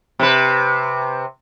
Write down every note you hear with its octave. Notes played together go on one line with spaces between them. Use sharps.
C3 B4